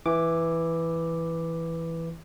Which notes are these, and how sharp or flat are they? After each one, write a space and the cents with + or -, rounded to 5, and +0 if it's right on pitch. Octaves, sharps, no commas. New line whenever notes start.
E3 +0 D6 +0